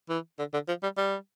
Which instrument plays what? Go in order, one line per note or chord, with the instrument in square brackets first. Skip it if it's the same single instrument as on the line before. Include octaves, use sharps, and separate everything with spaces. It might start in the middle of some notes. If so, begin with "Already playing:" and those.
[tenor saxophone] E3
D3
D3
F3
G3
G3